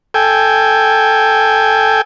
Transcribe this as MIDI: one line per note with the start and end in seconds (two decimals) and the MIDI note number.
0.14 2.01 69
0.14 2.01 79
0.14 2.01 80